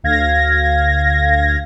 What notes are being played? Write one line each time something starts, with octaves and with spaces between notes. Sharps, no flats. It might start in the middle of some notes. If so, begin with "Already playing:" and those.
D2 F5 G#6 A#6